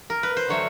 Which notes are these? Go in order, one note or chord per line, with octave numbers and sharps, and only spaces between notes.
A#4
B4
C5
D3 F#3 A3 C#5